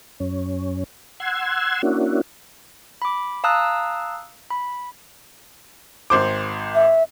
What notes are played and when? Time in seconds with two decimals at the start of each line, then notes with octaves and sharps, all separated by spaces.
0.20 F#2 C#4
1.20 F#5 C6 E6 G#6
1.83 A#3 C#4 D4 E4 F#4
3.02 B5 D6
3.44 F5 A5 A#5 D#6 E6 F#6
4.50 B5
6.10 G#1 C5 D6
6.75 E5